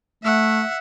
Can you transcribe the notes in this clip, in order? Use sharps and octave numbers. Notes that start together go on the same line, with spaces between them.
A3 E5 F#5